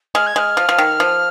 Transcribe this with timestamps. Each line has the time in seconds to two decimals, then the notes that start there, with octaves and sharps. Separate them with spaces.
0.15 G#3 F6
0.27 G#6
0.36 G#3 F6
0.57 F3
0.69 F3
0.78 D#3
1.00 F3